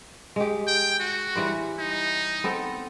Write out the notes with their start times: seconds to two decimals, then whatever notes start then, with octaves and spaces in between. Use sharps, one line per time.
0.36 G#3 G4
0.67 G5
1.00 F#4
1.35 E3 G3 C5
1.79 D#4
2.44 B3 C4 A4